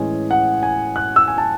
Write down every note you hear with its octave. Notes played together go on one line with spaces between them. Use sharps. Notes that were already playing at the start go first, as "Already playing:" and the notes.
Already playing: A2 E3 G#3 C#4 G#5
F#5
G#5
F#6
E6
G#5
A5